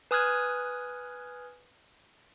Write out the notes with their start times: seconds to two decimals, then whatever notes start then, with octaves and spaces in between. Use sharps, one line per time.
0.11 B4 G#5 D#6 F6 F#6 G#6